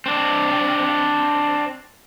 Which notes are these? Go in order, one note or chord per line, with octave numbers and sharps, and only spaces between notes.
C4 D4